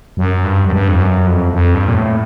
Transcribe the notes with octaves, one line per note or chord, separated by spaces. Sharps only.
F#2
G2
F#2
G2
F2
F#2
F2
F2
G2
A#2
A2